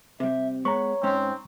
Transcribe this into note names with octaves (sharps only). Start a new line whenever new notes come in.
C3 G3 E5
G#3 B3 C#5 A#5 C#6
G#2 C4 C#4